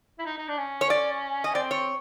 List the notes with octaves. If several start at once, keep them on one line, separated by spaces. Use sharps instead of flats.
E4
D#4
D#4
D4
C#4
C#5
D5
D#5
C4 D5
C#5